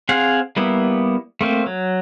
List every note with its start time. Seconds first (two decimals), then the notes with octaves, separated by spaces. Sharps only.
0.09 C4 G#4 F5 F#5
0.57 G3 A#3 B3 E4
1.41 A3 A#3 C4
1.66 F#3